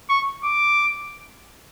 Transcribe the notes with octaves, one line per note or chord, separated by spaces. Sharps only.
C#6
D6